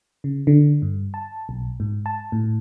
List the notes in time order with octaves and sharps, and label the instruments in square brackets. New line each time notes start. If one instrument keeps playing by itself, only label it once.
[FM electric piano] C#3
D3
G2
A5
B1
G#2
A5
A2